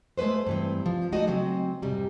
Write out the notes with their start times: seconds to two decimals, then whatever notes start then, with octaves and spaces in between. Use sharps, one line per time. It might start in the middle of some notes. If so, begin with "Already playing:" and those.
0.18 G#3 A3 C#4 B4 C5
0.47 G2 E3 C4
0.86 F3
1.12 G#3 A3 D4 D#4 F#4 D#5
1.27 C#3 F#3 C4
1.82 F2 G#2 C3 G3